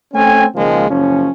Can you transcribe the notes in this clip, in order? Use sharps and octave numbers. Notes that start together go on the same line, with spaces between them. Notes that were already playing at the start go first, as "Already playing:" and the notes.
A3 C4 C#4 G5 G#5
C#2 D#3 F3 G#3 A#3
F#1 F3 C#4